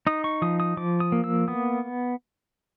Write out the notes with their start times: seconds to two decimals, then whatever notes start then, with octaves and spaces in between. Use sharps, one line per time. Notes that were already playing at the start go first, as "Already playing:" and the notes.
0.07 D#4 D#6
0.24 C#6
0.42 F3 D#6
0.60 D#6
0.77 F3 D6
1.00 D#6
1.12 A#3
1.24 E6
1.48 B3 D#6